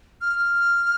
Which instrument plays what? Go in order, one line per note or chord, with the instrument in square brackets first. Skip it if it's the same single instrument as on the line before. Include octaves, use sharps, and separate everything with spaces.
[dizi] F6